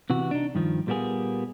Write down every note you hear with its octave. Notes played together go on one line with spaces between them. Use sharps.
C3 E3 F#4
D4 D#4
G2 D#3 F3
A#2 G3 A#3 B3 G#4